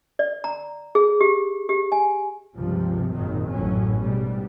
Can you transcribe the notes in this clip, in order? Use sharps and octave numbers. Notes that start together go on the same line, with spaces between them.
D5
A#5
G#4
G4
G4
G#5
C#2 G2 C3 F3
G#1 F#2 A#2 D#3
A1 F#2 A2 F#3 C#4
G#2 B2 G3